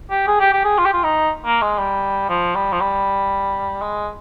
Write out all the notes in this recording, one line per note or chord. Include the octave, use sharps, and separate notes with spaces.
G4
G#4
G4
G4
G#4
F4
G4
F4
D#4
A#3
G#3
G3
F3
G3
F3
G3
G#3